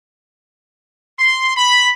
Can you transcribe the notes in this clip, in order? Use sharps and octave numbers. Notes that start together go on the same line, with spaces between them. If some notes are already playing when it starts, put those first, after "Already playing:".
C6
B5